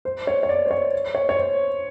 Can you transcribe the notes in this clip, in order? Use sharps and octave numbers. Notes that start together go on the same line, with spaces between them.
C5
C#5
C#5
D5
C5
C#5
C#5
C#5
C5